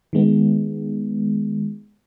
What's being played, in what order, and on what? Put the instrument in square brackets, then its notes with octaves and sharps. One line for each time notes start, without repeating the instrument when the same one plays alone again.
[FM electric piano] D#3 G#3 B3